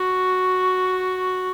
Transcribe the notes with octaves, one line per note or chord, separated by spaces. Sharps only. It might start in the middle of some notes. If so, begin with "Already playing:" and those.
Already playing: F#4 C#6